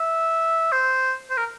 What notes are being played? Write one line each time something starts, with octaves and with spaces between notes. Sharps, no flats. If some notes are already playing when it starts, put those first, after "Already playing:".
Already playing: E5
C5
C5
A#4